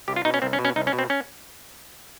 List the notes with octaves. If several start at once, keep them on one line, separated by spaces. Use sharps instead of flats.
C2 G4
F4
B2 D#4
C#4
C2 C4
C#4
B2
C#4
C2 D#4
C#4
B2
C4
C#4